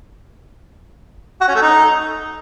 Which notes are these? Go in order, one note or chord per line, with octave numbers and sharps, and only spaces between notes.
F#4
C#4
A3
D#4